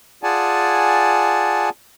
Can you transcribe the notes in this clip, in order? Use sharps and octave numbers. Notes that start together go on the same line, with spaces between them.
F4 G#4 D5 F#5 G#5 A5